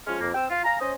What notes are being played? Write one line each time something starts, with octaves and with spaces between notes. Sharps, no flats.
F3 G#3 C#4 F6
F2 A#3
C4 G5 E6
F4
F5 G#5 A#5
C#4 C5 D#5